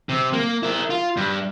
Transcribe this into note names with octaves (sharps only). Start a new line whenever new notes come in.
C3
A#3
E4 A#4
F4
G2